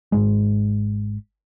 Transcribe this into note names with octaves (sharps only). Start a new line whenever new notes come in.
G#1 C#2 G#2 G#3